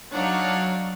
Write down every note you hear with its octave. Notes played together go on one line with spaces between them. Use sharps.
F#3 D4 D#4 C#5 F5 F#5